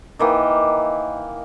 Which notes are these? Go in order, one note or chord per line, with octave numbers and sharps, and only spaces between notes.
D#3 E3 A#3 G5